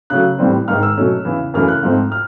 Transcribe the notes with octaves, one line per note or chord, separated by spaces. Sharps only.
C#3 F#3 A3 F#6
A2 E3 G3 C4
G#2 D#3 G#3 F6
E6
B2 F#3 A3 C#4
E2 C#3 E3
F#2 C#3 E3 A3 F6
F#6
G#2 F3 A3 C4
F6